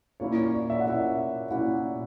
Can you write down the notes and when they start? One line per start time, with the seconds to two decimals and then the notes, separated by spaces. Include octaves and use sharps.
0.20 A#2 A#3 C#4 E4 C#5
0.37 C#5
0.54 D5
0.70 E5
0.80 F#5
0.86 A#2 A#3 C#4 E4 E5
1.51 A#2 A#3 C#4 E4 F#5